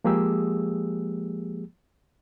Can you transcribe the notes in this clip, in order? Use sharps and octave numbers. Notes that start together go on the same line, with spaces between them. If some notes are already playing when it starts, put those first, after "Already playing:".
F3 G#3 A#3 G4 G#4 E6